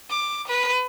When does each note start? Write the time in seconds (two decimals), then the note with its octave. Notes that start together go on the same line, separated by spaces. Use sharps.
0.10 D6
0.48 B4